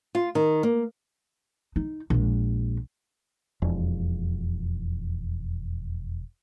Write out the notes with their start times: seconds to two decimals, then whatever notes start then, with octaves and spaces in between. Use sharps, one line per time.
0.15 F4
0.35 D#3
0.63 A#3
1.76 D#4
2.10 A#1 G#3
3.62 E1 F2